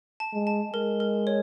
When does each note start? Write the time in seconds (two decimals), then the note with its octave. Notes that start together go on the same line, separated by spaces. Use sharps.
0.20 A5
0.33 G#3
0.47 A5
0.73 G#3 A#4
1.00 A#4
1.27 C#5